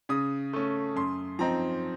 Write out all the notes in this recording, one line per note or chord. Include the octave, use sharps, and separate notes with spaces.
C#3 D#6
A3 C#4
F#2 C6
F3 C4 D#4 A#5